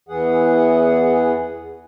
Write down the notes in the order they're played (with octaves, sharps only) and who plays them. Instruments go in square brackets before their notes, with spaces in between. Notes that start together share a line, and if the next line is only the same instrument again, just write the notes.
[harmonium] E2 E3 B3 G#4 F#5